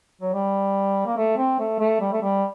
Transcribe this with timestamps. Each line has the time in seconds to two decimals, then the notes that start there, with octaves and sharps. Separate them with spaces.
0.21 F#3
0.33 G3
1.06 A#3
1.17 A3
1.37 C4
1.59 A3
1.79 A3
2.01 G3
2.13 A3
2.22 G3